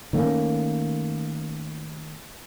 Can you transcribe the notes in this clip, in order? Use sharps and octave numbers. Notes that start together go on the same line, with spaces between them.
D#3 A3 A#3 C#4